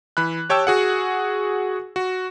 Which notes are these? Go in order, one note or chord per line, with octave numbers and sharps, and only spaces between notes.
E3 B5 F#6
G4 C#5 G5 A5 E6
F#4 G#4 F#5
F#4